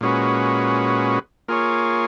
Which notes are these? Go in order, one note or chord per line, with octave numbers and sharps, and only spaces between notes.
A#2 G#3 C#4 F#4 B4
A#3 F4 G#4 C#5